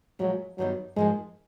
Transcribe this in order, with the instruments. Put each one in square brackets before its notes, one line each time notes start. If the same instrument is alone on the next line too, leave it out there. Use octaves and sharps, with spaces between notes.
[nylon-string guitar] A#2 F3 G#3 [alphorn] F#3
[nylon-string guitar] G2 D#3 G3 B3 D#4 [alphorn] F#3
[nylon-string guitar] G#2 F3 A#3 [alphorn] G#3